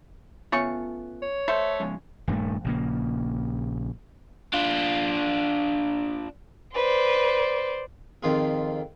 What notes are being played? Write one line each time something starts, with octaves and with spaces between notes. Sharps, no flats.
A3 B3 C#4 F4 C#6
C#5
A3 A4 C5 E5
F3 G#3 C#4
D#1 G2 G#3 A3
A#1 C#3 A#3
D4 F4
B4 C5 D5
F2 D#3 F4 G#4